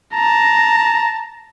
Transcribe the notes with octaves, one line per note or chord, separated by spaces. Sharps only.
A5 A#5